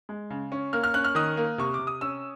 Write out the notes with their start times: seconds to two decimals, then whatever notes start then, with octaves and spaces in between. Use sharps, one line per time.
0.09 G#3
0.30 C#3
0.52 C#4
0.73 A#3 F6
0.84 F6
0.94 C#4 F#6
1.04 F6
1.15 D#3 D#6
1.37 A#3
1.58 C3 C#6
1.74 D6
1.79 C3
1.87 D#6
2.01 C#4 E6